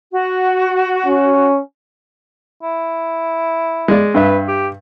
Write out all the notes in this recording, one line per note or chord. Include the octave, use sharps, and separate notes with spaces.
F#4
C#4
E4
G#3 D5
G2 B4 E5
G4